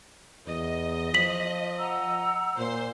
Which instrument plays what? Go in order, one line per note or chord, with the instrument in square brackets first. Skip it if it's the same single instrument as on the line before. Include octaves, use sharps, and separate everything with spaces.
[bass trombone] E2 [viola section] D#5
[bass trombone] F3 [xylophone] B6 F#7
[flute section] F#5 A#5 E6
[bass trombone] A#2 [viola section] C5